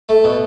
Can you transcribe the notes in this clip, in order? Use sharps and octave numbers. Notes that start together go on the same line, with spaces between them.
A3
B2